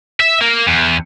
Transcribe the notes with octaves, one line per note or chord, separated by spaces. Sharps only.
E5
A#3
E2